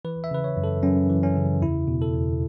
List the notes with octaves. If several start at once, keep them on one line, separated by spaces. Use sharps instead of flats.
E3 B4
E5
C#3 B4
C#5
F#2
A4
F#2 C#4
E3
C#4
C#3
E2 E4
B2
A4
E2